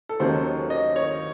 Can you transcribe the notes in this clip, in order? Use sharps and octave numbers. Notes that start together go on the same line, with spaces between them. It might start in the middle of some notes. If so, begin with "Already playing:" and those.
A4
D#2 D#3 F#3 C#4 C5
D#5
C#5